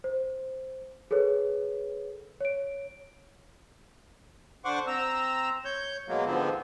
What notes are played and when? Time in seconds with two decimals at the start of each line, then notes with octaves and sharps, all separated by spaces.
0.04 C5
1.11 G#4 A4 B4 C#5
2.41 C#5 D7
4.65 D3 C5 F#5 C#6 D6
4.87 C4 A#5 E6
5.65 C#5 G6
6.08 B2 F#3 G#3 A#3
6.26 G#2 D3 F3 B3 C4